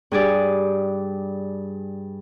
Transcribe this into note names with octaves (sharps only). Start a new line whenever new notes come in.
G2 G#4 D5